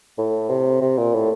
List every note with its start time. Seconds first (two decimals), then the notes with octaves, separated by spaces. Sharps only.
0.18 A2
0.49 C3
0.82 C3
0.98 A#2
1.13 A2